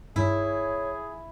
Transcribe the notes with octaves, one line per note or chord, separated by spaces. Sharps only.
G2 E4 G#4 C#5